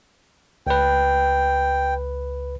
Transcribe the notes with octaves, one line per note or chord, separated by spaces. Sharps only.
C#2 B4 G5